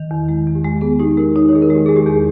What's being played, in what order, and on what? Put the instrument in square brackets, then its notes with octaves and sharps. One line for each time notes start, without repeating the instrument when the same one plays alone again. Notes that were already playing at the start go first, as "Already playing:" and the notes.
Already playing: [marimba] D#3
E2
[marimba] G#3 [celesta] E4
[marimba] E2
[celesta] G4
[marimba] G#3
[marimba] B3 [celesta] G#4
[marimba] D#4 [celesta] G4
[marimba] G#3 [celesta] A#4
[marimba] D#4 [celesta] C#5
[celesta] C#5
[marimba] D#3 [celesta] G#4
[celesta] A#4
[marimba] G#3
[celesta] G4
[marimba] G#3 [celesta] G#4
[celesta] G4
[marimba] E2 [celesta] G#4